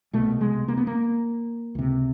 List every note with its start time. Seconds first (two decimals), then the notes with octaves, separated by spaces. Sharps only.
0.13 C2 B2 A3
0.41 G#3
0.68 A#3
0.77 B3
0.87 A#3
1.75 C#2 C3